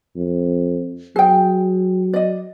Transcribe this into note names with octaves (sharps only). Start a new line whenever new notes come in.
F2
F#3 G#4 G5
D5 D#5